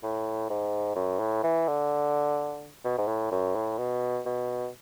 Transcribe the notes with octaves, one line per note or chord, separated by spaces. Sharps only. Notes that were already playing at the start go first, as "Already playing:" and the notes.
A2
G#2
F#2
A2
E3
D3
B2
G#2
A2
F#2
A2
B2
B2